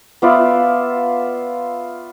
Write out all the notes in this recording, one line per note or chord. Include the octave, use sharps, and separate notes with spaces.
B3 F4 D5 E5